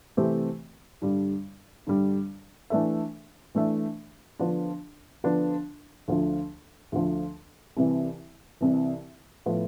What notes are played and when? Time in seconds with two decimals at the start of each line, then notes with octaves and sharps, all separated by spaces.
0.17 C3 E3 A3 C4 G4
1.02 G2 D3 G3
1.87 G2 D3 G3
2.70 E3 A3 D4 A4 E5
3.55 E3 A3 D4 A4 E5
4.39 D3 F3 B3 D4
5.24 D3 F3 B3 D4
6.08 D2 D3 F3
6.92 D2 D3 F3
7.77 C2 C3 E3
8.61 C2 C3 E3
9.46 A2 F3 B3